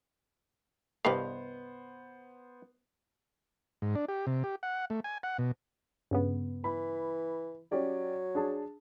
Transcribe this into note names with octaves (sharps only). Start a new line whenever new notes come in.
C2 G2 B3 G4 B4 C5 D#5 F5
G#2
D4
G4
C3
G4
F#5
A3
G#5
F#5
B2
G2 C#3 B3
E3 B5
F#3 C#4 G4 D5
D4 G#4 A5